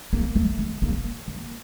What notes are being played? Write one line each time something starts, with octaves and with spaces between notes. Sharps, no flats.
A#3
A3
A3
A#3
A#3